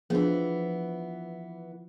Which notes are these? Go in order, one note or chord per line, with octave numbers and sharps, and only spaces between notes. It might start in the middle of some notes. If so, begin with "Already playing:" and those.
E3 F3 B3 D4 G#4